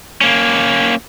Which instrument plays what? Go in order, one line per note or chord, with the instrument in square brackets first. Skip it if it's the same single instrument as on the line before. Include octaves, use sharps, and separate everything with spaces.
[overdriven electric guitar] A#3 C#4